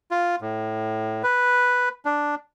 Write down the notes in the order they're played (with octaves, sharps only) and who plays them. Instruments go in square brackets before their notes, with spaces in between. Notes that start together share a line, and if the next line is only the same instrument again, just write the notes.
[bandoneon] F4
A2
B4
D4